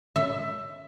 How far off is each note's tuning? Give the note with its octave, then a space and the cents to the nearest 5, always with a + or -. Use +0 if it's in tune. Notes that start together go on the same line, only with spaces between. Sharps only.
E5 +15